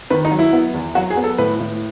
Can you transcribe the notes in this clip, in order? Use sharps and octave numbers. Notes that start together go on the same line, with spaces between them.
D#3 B4
D#4
F#3
E4
B3
E2
F#3 F#4
G#4
B3
A4
A2 B4
A2